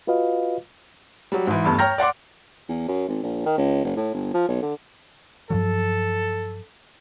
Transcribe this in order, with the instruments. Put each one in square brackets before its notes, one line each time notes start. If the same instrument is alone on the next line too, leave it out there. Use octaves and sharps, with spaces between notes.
[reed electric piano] F4 F#4 B4 D#5 F5
[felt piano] F#3 G3
G#2 E3
E2 G2 A3
C#5 G5 A#5 F6 G6 A#6
D5 F#5 C6 D6
[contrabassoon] E2
F#2
G#1
A#1
D#3
C#2
F#1
A2
G1
F3
B1
D3
[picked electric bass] G2 F3 F#3 [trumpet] A4